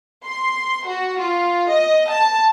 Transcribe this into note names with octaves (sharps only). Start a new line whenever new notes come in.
C6
F#4
F4
D#5
A5